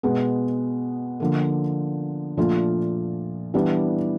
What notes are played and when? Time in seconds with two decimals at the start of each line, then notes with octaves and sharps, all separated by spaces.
0.03 B2 G#3 B3
1.20 D3 F3 A#3
2.37 A#2 F3 A3 D4 F4
3.54 E3 G3 B3 D4